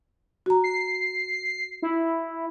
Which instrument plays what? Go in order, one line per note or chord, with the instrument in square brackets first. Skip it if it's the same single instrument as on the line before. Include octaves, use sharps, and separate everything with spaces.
[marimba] F#4 A#5
[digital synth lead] C7
E4